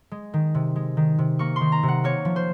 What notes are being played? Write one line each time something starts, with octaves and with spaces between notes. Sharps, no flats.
G#3
D#3
C3
G#3
D#3
C3
A#3 C#6
C6
D#3
A#5
C3
F#5
A#3 C#5
F3
C5